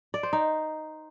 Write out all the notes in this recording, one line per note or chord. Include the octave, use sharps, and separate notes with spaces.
D5
C5
D#4